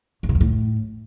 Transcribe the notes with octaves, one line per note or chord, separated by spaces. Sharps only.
G2
C3
F2
A2